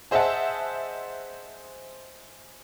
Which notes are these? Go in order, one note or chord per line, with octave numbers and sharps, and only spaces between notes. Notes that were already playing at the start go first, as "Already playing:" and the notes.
G#4 C5 D#5 E5 F#5 A5